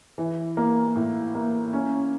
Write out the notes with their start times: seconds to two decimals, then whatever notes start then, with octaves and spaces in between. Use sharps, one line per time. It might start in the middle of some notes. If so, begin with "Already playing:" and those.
0.18 E3
0.57 A#3
0.95 A2
1.35 A#3
1.73 C#4